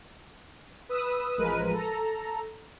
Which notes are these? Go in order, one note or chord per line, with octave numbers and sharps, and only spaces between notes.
B4 D#6 E6
A1 F3 G#3 A#4 B4 D#7
A4 A#5